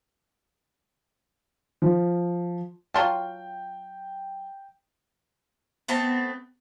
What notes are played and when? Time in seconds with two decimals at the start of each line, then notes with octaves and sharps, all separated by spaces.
1.82 F3
2.94 F#3 F4 G5 A5
5.88 A3 B3 C4 A5